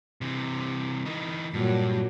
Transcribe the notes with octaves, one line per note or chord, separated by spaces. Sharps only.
C3 E3
E3 D#4
G2 A#2 F#3